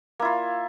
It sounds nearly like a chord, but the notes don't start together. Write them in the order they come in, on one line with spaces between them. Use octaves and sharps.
A#3 E4 F4